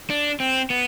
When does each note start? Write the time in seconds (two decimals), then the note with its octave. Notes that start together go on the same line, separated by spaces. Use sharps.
0.10 D4
0.40 C4
0.70 B3